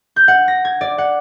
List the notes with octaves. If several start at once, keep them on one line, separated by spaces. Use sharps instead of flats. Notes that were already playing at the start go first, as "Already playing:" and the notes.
G6
F#5
A#6
G#6
D5
F#5